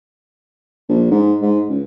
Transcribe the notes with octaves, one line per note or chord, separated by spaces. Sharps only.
A#1
G#2
G#2
C#2